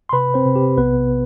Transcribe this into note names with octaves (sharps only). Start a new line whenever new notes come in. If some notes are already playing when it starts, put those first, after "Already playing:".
C6
C3 B4 B5
C4 C5
C3
G4
B1 B3 B4